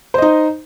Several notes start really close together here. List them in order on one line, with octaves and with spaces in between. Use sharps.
C5 D#5 D#4